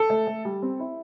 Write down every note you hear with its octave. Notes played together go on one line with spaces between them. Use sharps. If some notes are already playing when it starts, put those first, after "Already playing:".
Already playing: A4
A3
A3
G3
C4
E4